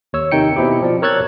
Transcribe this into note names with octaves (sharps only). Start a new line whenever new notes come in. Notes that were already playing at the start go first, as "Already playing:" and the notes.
D#2 C#5 E6
C3 D#3 D#4 G5 C#7
B2 C4 E4 G4
F3 D5
A#4 C#5 E6 F#6 G#6 A6